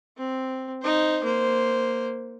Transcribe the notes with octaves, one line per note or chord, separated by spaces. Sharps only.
C4
D#4 C5
A#3 C5